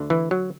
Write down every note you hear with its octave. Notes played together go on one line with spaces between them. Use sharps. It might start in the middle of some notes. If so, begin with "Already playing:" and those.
Already playing: D2 D3
E3
F#3